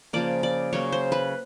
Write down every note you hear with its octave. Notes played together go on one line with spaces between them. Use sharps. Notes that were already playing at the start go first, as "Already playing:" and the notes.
C#3 F3 A#3 D5
D5
C#3 F#3 A#3 C#5
C5
B4